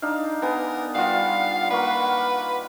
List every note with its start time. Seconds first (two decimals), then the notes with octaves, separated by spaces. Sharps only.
0.02 D4 D#4 F5
0.42 B3 A#4 G#5
0.95 G3 F4 F5 F#5
1.71 A#3 A#4 B4 C#6